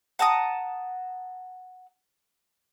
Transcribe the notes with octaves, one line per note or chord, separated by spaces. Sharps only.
F#5 A5 A#5 D#6